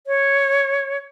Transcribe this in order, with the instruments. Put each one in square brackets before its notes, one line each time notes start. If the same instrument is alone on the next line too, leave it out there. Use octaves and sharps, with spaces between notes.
[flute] C#5